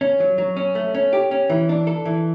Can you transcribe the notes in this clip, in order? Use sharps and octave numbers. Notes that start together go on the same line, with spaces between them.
C#4
F#3
F#3
C#4
A3
C#4
G4
C#4
E3
D4
A4
E3